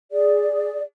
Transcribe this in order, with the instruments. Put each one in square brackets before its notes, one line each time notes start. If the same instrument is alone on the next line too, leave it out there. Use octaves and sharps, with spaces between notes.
[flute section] G#4 D5